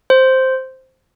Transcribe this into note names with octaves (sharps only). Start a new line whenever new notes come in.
C5